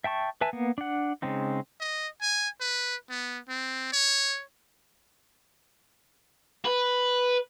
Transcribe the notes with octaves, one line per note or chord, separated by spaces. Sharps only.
E5 G5 A5 C#6
B4 E5 G#5 A5
A#3 B3
D4 F#5
C#3 G#3 C4 D#4
D#5
G#5
B4
B3
C4
C#5
B4